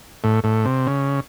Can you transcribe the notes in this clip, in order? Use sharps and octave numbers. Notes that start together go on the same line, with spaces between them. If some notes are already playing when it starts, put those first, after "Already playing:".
A2
A2
C3
C#3